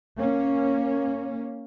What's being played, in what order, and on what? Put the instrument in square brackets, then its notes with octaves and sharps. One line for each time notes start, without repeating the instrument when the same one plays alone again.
[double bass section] A#3 C#4